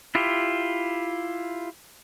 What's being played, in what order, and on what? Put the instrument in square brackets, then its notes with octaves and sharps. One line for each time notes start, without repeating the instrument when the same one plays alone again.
[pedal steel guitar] E4 F4 G4